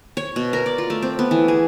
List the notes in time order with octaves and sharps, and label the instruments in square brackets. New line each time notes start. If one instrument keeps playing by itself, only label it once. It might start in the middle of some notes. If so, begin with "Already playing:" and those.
[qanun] C#5
B2
A#4
D5
F4
A3
C4
B3
E3
G#4